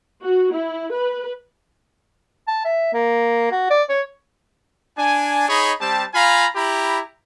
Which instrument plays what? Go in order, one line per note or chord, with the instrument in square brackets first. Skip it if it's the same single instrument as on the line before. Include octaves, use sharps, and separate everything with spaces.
[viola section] F#4
E4
B4
[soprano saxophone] A5
E5
A#3
F#4
D5
C#5
[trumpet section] D4 G#5
D#4 G#4 C#5 D#5 B5
G3 C4 G4 A5
F4 F5 G#5 A#5 B5
E4 G4 A#5 B5